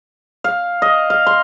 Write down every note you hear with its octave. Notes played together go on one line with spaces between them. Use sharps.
F5
D#5
F5
C6